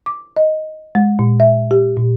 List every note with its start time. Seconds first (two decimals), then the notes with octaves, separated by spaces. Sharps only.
0.06 D6
0.36 D#5
0.95 G#3
1.19 A#2
1.40 E5
1.71 G4
1.96 A#2